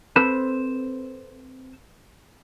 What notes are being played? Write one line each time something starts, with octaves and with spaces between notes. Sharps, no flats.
C4 A4 B4 C5